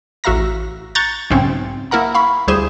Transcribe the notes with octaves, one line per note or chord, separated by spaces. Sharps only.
A1 F#4 E5 F5 A#5 A#6
A#5 C#6 F#6 G6 A6
B1 G#2 C#3 C4 C#4
A#3 E4 A#4 F#5 A#5
F5 B5 C#6
D2 G3 E4 G#4 C5 E7